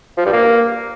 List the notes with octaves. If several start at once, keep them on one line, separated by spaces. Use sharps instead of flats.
F3
G2
A#3